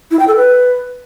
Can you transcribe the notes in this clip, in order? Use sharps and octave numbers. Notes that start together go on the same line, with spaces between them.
E4
G5
A4
B4